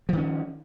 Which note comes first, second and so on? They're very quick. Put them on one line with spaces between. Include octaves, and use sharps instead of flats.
F3 D#3 C#4